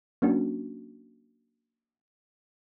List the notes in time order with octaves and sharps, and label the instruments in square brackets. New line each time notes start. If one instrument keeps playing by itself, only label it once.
[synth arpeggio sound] F#3 A#3 C#4 D4 F#4